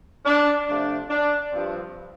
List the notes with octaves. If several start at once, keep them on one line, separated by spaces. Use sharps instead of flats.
D4
C3 F3 A3 D4
D4
G2 F3 C4